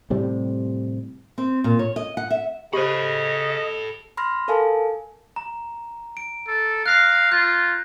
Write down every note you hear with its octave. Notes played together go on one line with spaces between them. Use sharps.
A2 C3 G3
C4
A#2
C#5
D#5
F#5
E5
C#3 G4 A4 C5 D#5 B5
B5 C6 F6 A#6
A4 A#4 F5 G#5 A5
A#5
D7
A4
F5 F#6 A#6 C7
F4 G6